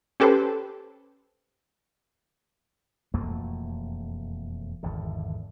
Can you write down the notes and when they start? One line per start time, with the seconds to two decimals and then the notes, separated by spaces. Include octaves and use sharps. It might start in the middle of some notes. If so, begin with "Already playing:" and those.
0.20 C#4 G4 A4 B4 C5
3.14 E1 F2 A3 A#3
4.83 G#1 E2 D3